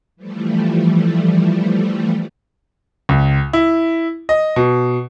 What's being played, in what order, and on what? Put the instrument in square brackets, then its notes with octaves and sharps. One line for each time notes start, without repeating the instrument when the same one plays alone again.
[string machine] E3 F3 G3 A3
[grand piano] C#2
E4
D#5
B2